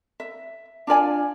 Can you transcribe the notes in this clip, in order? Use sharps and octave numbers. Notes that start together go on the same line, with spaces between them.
E5
D4 F4 D5 G#5